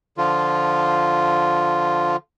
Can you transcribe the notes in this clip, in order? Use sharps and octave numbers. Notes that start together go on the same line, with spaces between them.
D3 F3 F4